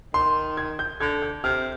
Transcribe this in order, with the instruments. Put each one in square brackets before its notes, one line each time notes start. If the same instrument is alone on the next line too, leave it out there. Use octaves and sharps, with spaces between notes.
[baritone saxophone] D#3 [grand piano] C6
[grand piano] G#6
G6
[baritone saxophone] D3 [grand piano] G#6
[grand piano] G6
[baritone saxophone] C3 [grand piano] F6